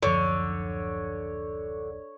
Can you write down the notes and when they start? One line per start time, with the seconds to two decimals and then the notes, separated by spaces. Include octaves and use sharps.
0.03 D1 F#2 D3 F3 C#5